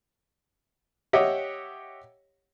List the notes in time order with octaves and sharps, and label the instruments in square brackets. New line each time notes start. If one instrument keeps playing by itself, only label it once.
[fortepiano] G4 C#5 D#5 E5 F#5